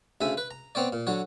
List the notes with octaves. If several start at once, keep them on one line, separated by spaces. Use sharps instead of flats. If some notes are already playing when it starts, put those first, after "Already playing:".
D2 C#3 E5 G#5
B4
A#5
B3 C4 C#5 D5
A#2
D3 F#3 C#5